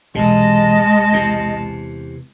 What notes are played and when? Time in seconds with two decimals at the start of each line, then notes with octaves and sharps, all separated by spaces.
0.15 E1 B1 C3 G#3 D#5 A5
1.13 E2 C3